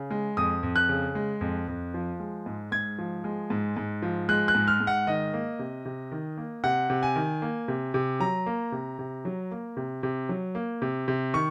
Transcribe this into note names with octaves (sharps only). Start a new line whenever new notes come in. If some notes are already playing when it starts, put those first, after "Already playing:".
Already playing: C#3
G#3
F2 D#6
F2
F#6
C#3
G#3
F2
F2
F3
G#3
G#2
G#2 G#6
F3
G#3
G#2
G#2
F3
G#3 F#6
F#6
G#2
F6
G#2
F#5
D#3 D#5
A#3
C3
C3
D#3
A#3
C3 F#5
C3
G#5
D#3
A#3
C3
C3
F#3 A#5
A#3
C3
C3
F#3
A#3
C3
C3
F#3
A#3
C3
C3
D#3 C#6